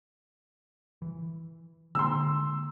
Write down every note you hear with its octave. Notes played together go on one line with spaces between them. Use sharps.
E3
D3 G#3 A#3 C6 E6